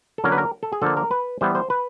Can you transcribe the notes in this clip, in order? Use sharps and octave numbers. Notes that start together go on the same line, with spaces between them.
A4
D3 F#3 A#3 C#4 A#4
B4
A#4
A4
G#4
D3 F3 A#3 A4
A#4
B4
E3 G3 B3 C5
C5
B4